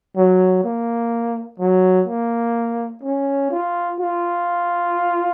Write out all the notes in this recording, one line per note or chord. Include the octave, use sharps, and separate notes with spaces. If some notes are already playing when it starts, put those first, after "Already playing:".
F#3
A#3
F#3
A#3
C#4
F4
F4